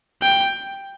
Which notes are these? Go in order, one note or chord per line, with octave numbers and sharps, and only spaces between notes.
G5